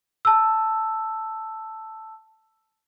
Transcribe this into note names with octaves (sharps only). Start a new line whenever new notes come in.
A5 E6